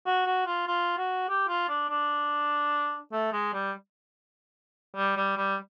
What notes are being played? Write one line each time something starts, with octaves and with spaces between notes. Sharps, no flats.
F#4
F#4
F4
F4
F#4
G4
F4
D4
D4
A3
G#3
G3
G3
G3
G3